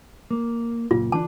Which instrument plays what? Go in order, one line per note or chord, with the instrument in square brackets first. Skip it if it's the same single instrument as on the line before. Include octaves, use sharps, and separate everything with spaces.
[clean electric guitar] A#3
[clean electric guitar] C#2 F#2 A#2 [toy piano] F4
[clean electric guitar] D3 E3 D4 [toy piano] A5